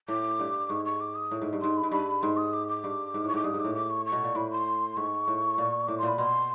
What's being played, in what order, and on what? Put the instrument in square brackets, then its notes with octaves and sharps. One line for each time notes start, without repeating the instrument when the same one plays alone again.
[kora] A2 [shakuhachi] D6
[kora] G2
[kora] G#2 [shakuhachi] C#6
[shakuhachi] C#6
D6
D#6
[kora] A2
G#2
G2
[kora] G#2 [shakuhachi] C6
[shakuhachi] B5
[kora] G#2
[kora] G2 [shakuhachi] B5
[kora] G#2 [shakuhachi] C6
[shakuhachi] D#6
D6
D6
[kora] G2
G#2
[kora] A2 [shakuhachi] C#6
[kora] G#2 [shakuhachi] D6
[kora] G2 [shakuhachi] D#6
[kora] G#2
[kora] A2 [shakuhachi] D6
[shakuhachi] D6
C#6
C#6
[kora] B2
A#2
[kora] A2 [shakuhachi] B5
[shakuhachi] C6
[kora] G#2 [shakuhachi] C#6
[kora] A2
A#2
[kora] A2 [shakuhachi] D6
[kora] A#2 [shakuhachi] C6
[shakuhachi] B5
[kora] B2 [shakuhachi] C6